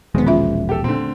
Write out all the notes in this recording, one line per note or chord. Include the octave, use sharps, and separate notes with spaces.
E1 A#1 D#3 G#3 B3
C#4 F4 E5
G4 A4
A#2 D3 A3 C4